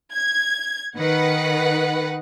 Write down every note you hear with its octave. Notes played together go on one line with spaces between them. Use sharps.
G#6
D#3 B4 F#5